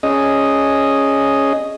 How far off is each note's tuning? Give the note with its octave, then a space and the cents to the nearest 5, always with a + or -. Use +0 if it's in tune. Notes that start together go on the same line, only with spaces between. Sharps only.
C#4 -5 G#4 +0 D#5 +0